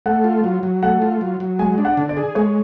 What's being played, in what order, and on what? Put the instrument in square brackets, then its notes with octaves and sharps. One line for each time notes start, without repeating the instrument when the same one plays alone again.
[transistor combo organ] A3 [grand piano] F#5
[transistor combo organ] F4
F#3
F#3
[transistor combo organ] A3 [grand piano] F#5
[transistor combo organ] F4
F#3
F#3
[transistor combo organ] G#3 [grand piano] G#5
[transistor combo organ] D4
[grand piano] F#5
[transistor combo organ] D3
[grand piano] D5
[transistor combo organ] G#4
[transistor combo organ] G#3 [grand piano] C#5